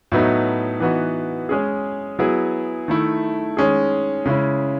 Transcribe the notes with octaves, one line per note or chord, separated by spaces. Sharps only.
A2 F#3 B3 D#4
E3 B3 D#4 F#4
G#3 C#4 G#4
F#3 B3 E4 G#4
D#3 A3 E4
D#3 G#3 C#4 G#4
C#3 G#3 C#4 E4